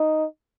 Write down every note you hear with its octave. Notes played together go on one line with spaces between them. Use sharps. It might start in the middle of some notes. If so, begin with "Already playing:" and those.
Already playing: D#4